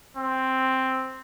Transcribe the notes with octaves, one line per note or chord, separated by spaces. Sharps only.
C4